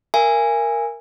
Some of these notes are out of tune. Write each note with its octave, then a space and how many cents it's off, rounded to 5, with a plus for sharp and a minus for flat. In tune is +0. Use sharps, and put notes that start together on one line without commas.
A#4 +0 E5 +45 G#5 -15